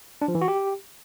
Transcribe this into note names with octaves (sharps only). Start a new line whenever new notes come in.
D4
F3
E3
F#4
G4